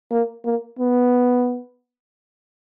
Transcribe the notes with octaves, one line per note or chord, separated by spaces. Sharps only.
A#3
A#3
B3